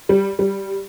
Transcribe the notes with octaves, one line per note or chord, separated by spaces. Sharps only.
G3
G3